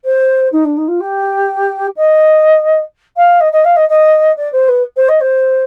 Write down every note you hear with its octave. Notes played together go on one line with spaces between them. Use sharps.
C5
D#4
D4
D#4
F4
G4
D#5
F5
D#5
D#5
F5
D#5
D#5
D5
C5
B4
C5
D#5
C5